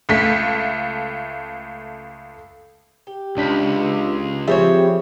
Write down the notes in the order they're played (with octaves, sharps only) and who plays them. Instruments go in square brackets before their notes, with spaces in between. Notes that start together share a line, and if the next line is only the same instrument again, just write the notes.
[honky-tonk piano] C#2 A3 B6
[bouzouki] G4
[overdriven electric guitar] C#2 [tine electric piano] D4 B6
[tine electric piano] F3 G#4 E5 [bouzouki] G3 C4 C#5